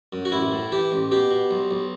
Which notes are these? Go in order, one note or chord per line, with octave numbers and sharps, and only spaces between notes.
F#2
F#4
A1 E4
A2
E3 G4
A1
B2 G4
B2
B1
B1